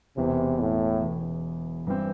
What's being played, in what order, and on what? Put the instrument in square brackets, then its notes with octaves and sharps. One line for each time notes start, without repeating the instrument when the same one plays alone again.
[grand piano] E1 E2 E3 [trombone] C3
[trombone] A2
[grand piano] E1 E2 E3
G2 E3 C4